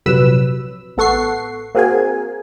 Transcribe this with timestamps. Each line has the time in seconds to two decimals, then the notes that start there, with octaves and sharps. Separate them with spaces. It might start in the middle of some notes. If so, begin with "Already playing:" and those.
0.06 A#1 F2 C3 F#3 B4 E6
0.97 A1 B3 A4 F#5 C#6 C7
1.75 A#3 C4 F#4 G#4 A#4 G#5